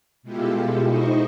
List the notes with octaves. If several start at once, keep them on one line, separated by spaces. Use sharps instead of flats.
B2 G#3 E4 F4 G4 A4
D#4 E4 C5 D#5 C#6